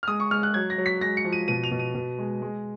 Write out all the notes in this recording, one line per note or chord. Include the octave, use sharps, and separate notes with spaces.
F6
G#3 D#6
C#6
G#3 F6
F#6
F#3 G#6
A#6
F#3
B6
G#3 A#6
C#7
F3
D#7
B2 D#7
F7
B2
D#7
B2
G#3
G#3